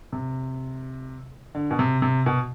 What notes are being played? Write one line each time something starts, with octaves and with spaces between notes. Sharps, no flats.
C3
D3
B2
C3
C3
B2